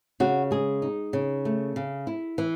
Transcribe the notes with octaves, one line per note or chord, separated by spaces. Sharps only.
C#3 F#4
G#3 G#4
D#4
C#3
A3
C#3
E4
E3